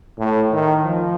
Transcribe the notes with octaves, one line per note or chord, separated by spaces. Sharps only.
A2
D#3
F3